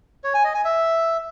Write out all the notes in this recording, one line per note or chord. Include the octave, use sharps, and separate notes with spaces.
C#5
G#5
D#5
G#5
E5